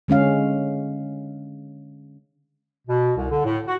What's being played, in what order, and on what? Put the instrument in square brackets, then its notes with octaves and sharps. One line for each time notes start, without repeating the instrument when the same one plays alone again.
[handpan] D3 G#3 C#4 F5
[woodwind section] B2
C2
D3
A2
F#4